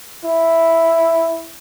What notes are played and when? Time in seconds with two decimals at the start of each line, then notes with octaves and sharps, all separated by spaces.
0.25 E4